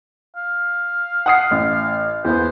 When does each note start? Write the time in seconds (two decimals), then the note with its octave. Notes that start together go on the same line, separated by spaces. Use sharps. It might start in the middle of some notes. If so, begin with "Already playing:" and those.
0.36 F5
1.26 F#5 D#6 C7
1.51 A1
2.25 E2 B3 C5